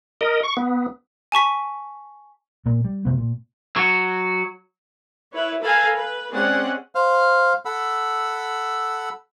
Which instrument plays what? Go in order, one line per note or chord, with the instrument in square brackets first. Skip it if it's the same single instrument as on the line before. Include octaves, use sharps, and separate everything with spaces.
[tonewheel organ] A#4 D#5
C#6
B3
[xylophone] G#5 A5 C#6 B6
[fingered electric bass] A#2 A#3
G3
F#1 C3 B3
A#2
[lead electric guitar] F#3 F#4
[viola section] E4 B4 C#5
A4 B4 F5 G#5 A#5
B4
G#3 C4 C#4 G#4 D5 F#5
[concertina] C5 F5 F6
A4 F#5 B5 E6